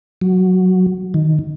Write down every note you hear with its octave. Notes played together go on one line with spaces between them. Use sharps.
F#3
D#3